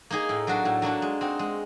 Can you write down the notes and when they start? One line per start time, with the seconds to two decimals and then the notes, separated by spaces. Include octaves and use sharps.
0.10 A#3 D#4 G#4
0.29 A2
0.47 F#3 A#3 D4 F#4
0.65 A2
0.82 F#3 A#3 D4 F#4
1.02 G#3
1.21 C4 D#4 F#4
1.39 G#3